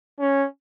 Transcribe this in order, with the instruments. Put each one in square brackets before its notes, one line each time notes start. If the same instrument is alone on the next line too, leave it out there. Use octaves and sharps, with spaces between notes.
[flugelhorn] C#4